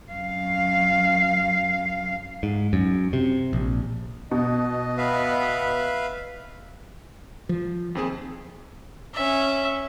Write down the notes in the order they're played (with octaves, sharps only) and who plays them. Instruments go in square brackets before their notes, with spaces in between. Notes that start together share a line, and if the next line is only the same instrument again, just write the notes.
[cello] F#2 F5
[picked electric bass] G#2
F#2
C3
A#1
[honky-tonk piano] B2 [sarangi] D#5
[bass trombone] B3 [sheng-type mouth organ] B4 E5 F5
[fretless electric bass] F3
[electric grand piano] D#2 C4 G#4
[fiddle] C#4 E5